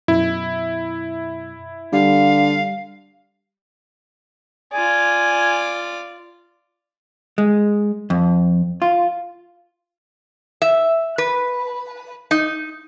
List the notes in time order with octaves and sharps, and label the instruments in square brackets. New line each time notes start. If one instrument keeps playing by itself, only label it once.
[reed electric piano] F#2 B2 [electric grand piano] E4
[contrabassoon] D3 [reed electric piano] G3 [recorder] F5
[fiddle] F4 D5 [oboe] G#5
[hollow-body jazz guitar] G#3
F2
F4
[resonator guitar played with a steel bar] E5
B4
D#4